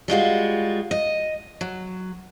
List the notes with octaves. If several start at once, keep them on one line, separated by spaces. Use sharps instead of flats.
G3 G#3 F4 F#4
D#5
F#3